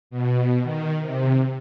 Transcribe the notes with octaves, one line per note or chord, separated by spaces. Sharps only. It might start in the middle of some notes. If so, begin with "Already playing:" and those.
B2
D#3
C3